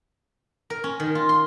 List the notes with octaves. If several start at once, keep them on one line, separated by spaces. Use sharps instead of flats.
A#4
C#4
D#3
F4
C6